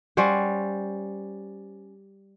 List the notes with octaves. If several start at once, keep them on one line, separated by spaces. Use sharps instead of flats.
G3 C#4 C5 F#5